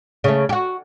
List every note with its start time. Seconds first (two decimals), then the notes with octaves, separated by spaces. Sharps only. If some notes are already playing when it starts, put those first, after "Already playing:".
0.24 C#3 A3
0.49 F#4 G4